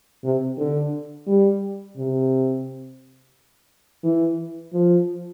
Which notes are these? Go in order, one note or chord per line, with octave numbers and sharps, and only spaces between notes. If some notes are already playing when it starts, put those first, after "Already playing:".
C3
D3
G3
C3
E3
F3